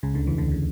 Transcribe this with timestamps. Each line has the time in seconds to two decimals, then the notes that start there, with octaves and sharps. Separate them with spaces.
0.03 C#2 C#3
0.14 D2 D3
0.27 E2 E3
0.38 D2 D3
0.51 C#3